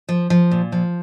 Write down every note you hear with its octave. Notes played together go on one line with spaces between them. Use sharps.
F3
F3
A#2
F3